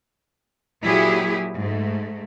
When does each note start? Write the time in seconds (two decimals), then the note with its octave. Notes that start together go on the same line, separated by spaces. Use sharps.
0.83 A#2 F#3 E4 G4 G#4
1.56 G#2 A3